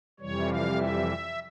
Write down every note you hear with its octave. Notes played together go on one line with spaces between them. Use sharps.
F2 C3 E3 G3 C#5
F5
E5